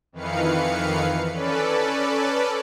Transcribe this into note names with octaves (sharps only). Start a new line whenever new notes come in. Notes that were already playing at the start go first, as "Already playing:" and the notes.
F2 D#3 E3 B4 F5 C#7
C#4 A4 B4 D5